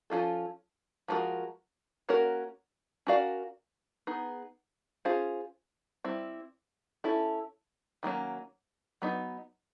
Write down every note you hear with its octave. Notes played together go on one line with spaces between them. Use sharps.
F3 A3 C#4 F4 A4
F3 G#3 C#4 F#4 A#4
A#3 C#4 F#4 A#4 C#5
C#4 F#4 A#4 D5 F5
B3 D#4 G#4
C#4 F4 G#4 C5 F5
G3 C4 E4
C#4 E4 A4
D#3 F#3 A#3 C#4
F#3 B3 D#4